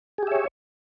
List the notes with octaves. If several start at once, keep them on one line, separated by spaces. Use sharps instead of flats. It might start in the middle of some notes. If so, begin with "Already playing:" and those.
G4 G#4 C#5 E5